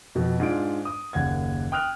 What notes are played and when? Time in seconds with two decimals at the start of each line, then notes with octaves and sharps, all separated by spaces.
0.15 F2 B2
0.40 G#2 D4 F4 D7
0.85 D#6
1.13 F#1 D#2 F#5 G#6
1.72 G5 D#6 F6 F#6 F7